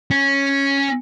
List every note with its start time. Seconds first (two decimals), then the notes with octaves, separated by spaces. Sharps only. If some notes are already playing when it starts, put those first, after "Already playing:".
0.11 C#4